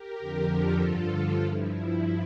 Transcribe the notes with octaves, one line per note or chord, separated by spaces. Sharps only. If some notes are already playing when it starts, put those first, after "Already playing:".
Already playing: G4 A#4
F2 D3 F3
F4 A4
G2 D3 F3
G2 F3 E4